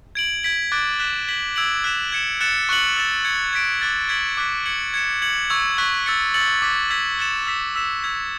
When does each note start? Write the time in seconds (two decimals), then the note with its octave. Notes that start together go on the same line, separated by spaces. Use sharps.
0.15 G#6 D7 F#7
0.43 G#6 B6 D7 F#7
0.72 D6 F#6 A6 D7
1.00 F#6 B6 E7
1.28 G#6 B6 F#7
1.56 E6 G#6 D7 F#7
1.84 F#6 B6 E7
2.12 G#6 C#7 E7
2.41 F#6 A6 C#7 E7
2.69 C#6 F#6 C#7 F#7
2.96 E6 A6 E7
3.25 G#6 C#7 F#7
3.53 G#6 B6 D7
3.81 D6 F#6 A6
4.09 G#6 B6 D7 F#7
4.37 D6 F#6 B6
4.66 G#6 C#7 F#7
4.94 G#6 C#7 E7
5.22 G#6 C#7 F#7
5.50 C#6 E6 G#6
5.78 C#6 F#6 B6
6.06 E6 A6 C#7
6.34 E6 A6 C#7 F#7
6.62 D6 F#6 B6
6.90 E6 G#6 B6
7.19 F#6 A6 C#7 E7
7.47 E6 B6 E7
7.76 E6 B6 E7
8.03 E6 G#6 B6